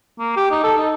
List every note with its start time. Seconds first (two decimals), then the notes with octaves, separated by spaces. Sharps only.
0.19 A#3
0.37 G4
0.51 D#4
0.64 A4
0.78 D#4